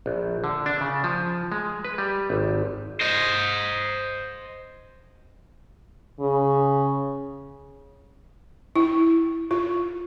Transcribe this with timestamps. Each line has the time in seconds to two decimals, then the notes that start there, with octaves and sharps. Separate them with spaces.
0.06 A#1
0.44 D3
0.66 D4
0.81 C#3
1.04 F3
1.52 G#3
1.85 B4
1.98 G3
2.30 G#1
3.01 C5 D#5
6.20 C#3
8.76 E4
9.51 F4